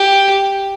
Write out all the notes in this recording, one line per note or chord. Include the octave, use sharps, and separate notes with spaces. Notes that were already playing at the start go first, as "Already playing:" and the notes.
Already playing: G4